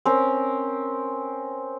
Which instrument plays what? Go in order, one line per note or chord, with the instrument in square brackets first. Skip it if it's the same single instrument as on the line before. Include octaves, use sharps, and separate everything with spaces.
[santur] C4 C#4 A#4